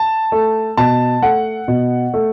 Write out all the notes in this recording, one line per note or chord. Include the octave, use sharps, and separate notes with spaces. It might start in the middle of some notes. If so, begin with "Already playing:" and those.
Already playing: A5
A3
B2 A5
A3 F#5
B2
A3